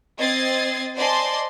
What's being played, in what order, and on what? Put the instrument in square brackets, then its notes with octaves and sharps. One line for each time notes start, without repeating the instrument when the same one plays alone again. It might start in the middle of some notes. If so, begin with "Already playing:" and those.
[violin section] C4 D#5 G#6 A6 C7
C5 D5 D#5 G#5 A5 C6